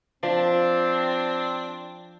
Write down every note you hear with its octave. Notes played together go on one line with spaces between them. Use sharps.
F3 C4 D4